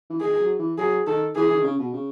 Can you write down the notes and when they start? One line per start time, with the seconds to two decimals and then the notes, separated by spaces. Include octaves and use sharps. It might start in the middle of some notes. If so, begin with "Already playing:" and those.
0.10 E3
0.21 D#3 G#4
0.40 F#3
0.59 E3
0.78 F#3 G#4
1.06 D#3 A4
1.35 E3 G#4
1.50 E3
1.57 D#3
1.64 C#3
1.79 B2
1.94 C#3